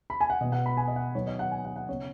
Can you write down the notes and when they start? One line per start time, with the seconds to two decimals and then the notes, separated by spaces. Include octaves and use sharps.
0.10 B5
0.21 G#5
0.30 F#5
0.41 B2 B3 D#5
0.52 F#5
0.66 B5
0.77 G#5
0.88 D#5
0.96 F#5
1.15 D#3 F#3 B3 C#5
1.27 D#5
1.39 F#5
1.51 G#5
1.65 F#5
1.76 F#5
1.88 C#3 B3 C#5